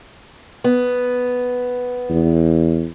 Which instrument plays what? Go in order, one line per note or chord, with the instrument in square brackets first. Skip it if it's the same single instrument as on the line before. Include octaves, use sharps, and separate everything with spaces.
[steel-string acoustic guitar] B3
[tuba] E2